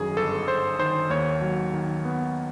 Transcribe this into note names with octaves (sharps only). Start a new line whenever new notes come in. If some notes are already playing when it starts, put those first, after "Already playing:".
Already playing: G1 F#2 D#3 G#4
G1 A4
G1 C5
D#3 C5
D#2 C#5
F#3
D#3
B3